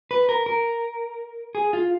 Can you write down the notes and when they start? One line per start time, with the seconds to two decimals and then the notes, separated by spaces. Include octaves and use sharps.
0.11 B4
0.29 A#4
0.46 A#4
1.55 G#4
1.73 F4